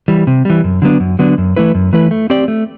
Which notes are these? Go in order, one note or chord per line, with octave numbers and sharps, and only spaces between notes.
E3 G3
C3
E3 G3
F#2
D3 F#3 B3 D4
F#2
D3 F#3 B3 D4
F#2
E3 A3 E4 B4
F#2
E3 A3 E4 B4
A3
C4 G4 D5
A3